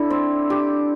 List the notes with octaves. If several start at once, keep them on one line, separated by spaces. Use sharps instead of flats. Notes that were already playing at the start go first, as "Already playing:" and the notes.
Already playing: D4 E4 A4
C4
G4